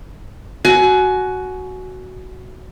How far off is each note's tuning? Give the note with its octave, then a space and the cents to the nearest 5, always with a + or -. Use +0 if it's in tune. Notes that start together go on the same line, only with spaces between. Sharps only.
F#4 +5 G#5 +30